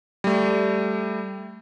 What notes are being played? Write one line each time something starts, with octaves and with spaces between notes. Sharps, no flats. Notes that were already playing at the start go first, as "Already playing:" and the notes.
G3 A3